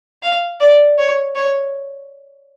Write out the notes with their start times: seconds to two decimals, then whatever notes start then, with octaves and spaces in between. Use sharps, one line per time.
0.23 F5
0.60 D5
0.98 C#5
1.35 C#5